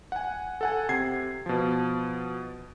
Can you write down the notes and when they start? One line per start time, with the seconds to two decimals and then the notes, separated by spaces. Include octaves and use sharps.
0.12 F#5 G#5
0.61 A4 F#5 G#5
0.89 C3 G#6 C7
1.46 B2 F3